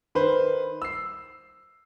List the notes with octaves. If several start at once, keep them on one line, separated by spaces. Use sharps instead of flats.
D#3 B4 C5
E6 C7